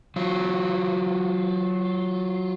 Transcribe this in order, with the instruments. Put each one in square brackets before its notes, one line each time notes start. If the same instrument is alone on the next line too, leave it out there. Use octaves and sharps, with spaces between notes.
[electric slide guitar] F#3 F4